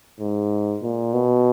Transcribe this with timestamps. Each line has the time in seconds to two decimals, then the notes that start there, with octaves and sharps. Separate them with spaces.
0.20 G#2
0.82 A#2
1.14 B2